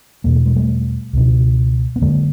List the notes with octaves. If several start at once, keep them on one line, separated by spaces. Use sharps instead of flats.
E2 B2 A#3
A3
G#3
G3 A3
C#2 B2
B3
F#2 D3 G#3 A#3